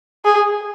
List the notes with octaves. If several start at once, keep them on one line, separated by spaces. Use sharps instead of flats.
G#4